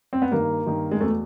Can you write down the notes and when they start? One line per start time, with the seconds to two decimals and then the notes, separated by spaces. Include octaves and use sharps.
0.13 C4
0.22 B3
0.31 G2 D#3 A#3
0.66 G2 D#3
0.91 G#3
1.00 E2 B2 A3